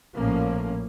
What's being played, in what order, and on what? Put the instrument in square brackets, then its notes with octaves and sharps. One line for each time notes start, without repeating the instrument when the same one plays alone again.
[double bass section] A#1 A2 F3 A#3 C#4